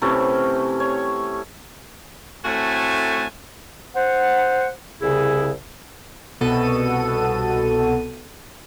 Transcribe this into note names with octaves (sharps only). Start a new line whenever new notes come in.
C3 E3 A3 C#4
C#5
A2 A3 C4 F#4 G#5 A5
C5 F#5
C2 C#3 E4 G#4
C2 B2 B3 F#4 A4 D#7